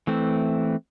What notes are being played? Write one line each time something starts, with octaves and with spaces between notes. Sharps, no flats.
E3 A3 C4